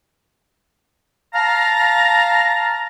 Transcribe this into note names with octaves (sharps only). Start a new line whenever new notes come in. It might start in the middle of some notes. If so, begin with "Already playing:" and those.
F5 A5 A#5